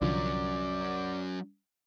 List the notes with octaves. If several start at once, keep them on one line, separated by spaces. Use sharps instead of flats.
C2 D3 F3 F#3 C#4 D5